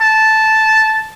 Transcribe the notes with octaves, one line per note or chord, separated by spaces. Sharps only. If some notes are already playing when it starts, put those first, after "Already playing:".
A5